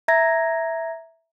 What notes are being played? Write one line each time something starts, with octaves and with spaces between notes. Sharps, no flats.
E5 A#5 G#6 A#6